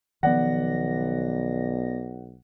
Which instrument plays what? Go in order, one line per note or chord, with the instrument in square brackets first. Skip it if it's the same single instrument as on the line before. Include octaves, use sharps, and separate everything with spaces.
[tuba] B1 [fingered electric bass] D#3 F3 [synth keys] B3 D5 A#6 [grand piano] F#5